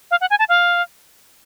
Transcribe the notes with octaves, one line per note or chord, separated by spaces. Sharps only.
F5
F#5
G#5
A5
F5